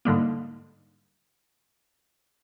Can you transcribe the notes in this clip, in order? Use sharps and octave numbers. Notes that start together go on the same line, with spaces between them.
G#2 D3 G3 A#3